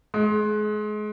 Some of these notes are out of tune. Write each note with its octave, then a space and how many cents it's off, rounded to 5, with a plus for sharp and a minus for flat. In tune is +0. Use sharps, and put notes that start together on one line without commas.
G#3 +30